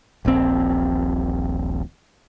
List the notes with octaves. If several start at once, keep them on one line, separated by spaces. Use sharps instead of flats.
D#1 A#1 C3 C4